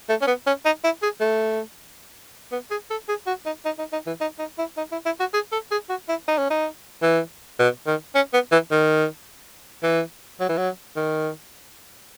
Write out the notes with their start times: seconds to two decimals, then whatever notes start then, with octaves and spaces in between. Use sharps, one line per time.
0.09 A3
0.22 C#4
0.27 B3
0.47 C#4
0.65 D#4
0.84 E4
1.03 G#4
1.21 A3
2.52 B3
2.71 G#4
2.90 A4
3.09 G#4
3.27 F#4
3.45 D#4
3.65 D#4
3.79 D#4
3.93 D#4
4.07 E3
4.21 D#4
4.39 D#4
4.58 E4
4.77 D#4
4.92 E4
5.06 E4
5.20 F#4
5.33 G#4
5.52 A4
5.71 G#4
5.89 F#4
6.09 E4
6.28 D#4
6.38 C#4
6.50 D#4
7.02 E3
7.59 B2
7.87 D#3
8.15 C#4
8.33 B3
8.52 E3
8.71 D#3
9.83 E3
10.40 F#3
10.49 E3
10.57 F#3
10.96 D#3